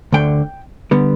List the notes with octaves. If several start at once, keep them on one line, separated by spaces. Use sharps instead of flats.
D2 D3 A3 G5
D3 G3 B3